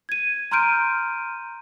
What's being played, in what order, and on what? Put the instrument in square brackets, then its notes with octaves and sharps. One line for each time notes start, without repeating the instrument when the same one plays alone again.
[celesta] G#6 D#7
A#5 C6 F6 G6 D7 D#7